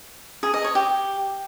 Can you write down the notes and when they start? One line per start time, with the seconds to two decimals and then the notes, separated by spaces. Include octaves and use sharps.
0.43 G#4
0.54 D#5
0.64 C#5
0.75 G4